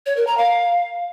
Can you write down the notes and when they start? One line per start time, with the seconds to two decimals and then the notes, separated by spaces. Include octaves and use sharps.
0.06 C#5
0.17 A#4
0.27 A#5
0.37 F5